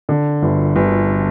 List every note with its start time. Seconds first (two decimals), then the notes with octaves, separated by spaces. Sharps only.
0.09 D3
0.42 G1
0.76 G1